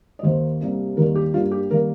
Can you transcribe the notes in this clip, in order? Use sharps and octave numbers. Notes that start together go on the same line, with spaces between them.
D#5
D#2 D#3 A#3 C5
C2 C3 G3 A#3
D#2 D#3 G3 A#3 A#4
G4
G2 G3 A#3 F4
G4
D#3 G3 A#3 A#4